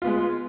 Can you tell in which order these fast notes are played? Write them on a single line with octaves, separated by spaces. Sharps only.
F4 B3 G#3